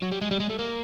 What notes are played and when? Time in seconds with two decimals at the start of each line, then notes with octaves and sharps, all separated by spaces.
0.02 F#3
0.12 G3
0.22 G#3
0.31 G3
0.40 G#3
0.49 A3
0.59 A#3